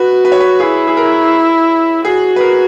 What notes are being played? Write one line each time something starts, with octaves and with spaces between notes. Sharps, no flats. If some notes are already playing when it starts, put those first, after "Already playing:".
Already playing: F#4 B4
B4
C#5
B4
E4 G#4
G#4
A#4
F#4 G#4
B4
A#4